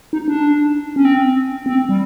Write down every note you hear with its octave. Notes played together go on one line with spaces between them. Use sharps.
D#4
D4
C#4
C4
C4
G3